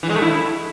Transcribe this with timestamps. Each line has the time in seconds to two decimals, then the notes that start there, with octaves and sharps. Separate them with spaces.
0.03 E3
0.09 G#3
0.16 A3
0.22 E4